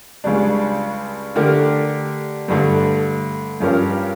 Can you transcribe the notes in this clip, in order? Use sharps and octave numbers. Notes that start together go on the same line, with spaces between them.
C#2 C#3 G3 D4
D3 A3 D4 G4 A#4
G2 D3 A3
G2 F3 C#4 G4 A#4